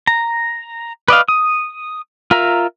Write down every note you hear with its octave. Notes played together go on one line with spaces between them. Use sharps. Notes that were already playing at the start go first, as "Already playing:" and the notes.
A#5
B4 D5 D#5 F5
D#6
F4 A#4 E5 A#5